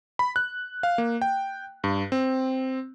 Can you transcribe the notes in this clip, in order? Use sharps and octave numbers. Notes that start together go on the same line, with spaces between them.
B5
F#6
F5
A#3
G5
G2
C4